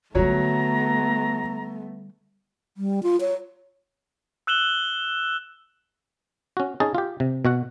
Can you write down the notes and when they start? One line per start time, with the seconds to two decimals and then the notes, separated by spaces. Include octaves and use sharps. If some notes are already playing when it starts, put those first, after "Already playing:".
0.15 D3 F#3 G3 A3 B3 C#5 A#5
2.77 G3
3.03 F4
3.20 C#5
4.47 E6 F#6 E7 F#7 G7
6.57 C#4 F#4
6.80 C#4 D#4 G#4 A5
6.95 F4 G4
7.20 C3
7.45 B2 F#4 F#5